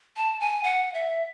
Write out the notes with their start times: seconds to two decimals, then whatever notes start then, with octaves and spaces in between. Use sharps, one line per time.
0.17 A5
0.40 G#5
0.64 F#5
0.94 E5